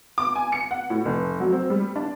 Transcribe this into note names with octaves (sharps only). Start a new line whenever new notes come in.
D6
G#5
C#7
F#5
A2
F1
F#3
C4
G3
D4